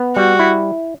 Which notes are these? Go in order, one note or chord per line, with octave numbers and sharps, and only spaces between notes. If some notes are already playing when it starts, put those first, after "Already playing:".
Already playing: B3
G3 F#4
E4